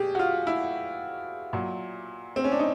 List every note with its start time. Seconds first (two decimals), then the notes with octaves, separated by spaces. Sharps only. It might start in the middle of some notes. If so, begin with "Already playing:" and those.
Already playing: B2 G4 G#4
0.15 F#4
0.19 F4
0.47 E4
1.53 A#2 F#3
2.36 C4
2.44 C#4
2.52 D4
2.59 D#4